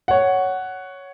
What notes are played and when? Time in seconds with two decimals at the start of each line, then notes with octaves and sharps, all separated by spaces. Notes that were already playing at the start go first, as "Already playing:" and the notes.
0.08 C#5 F#5